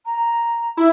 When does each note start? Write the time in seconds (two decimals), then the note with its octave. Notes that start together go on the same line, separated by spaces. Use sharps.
0.05 A#5
0.77 E4